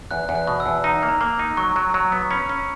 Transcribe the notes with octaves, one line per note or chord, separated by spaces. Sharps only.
E2 F#6
E2
F#6
B2
E6
E2
D#4 A#5
A#3
A#5
A#3
D#4
F#3 C#6
F#3
F#3
B3
C#4 B5
C#4